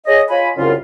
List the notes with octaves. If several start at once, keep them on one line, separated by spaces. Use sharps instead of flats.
G#4 C#5 D#5
F4 C#5 G#5 B5
C2 F#2 C#3 F4